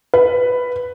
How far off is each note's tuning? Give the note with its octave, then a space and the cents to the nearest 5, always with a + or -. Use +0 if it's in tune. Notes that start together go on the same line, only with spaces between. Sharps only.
B4 +5